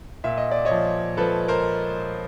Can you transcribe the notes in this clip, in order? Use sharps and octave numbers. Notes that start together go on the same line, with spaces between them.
A#2 E5
D#5
D5
C#5 D#5
F3
F3 A4 B4
A#4 C5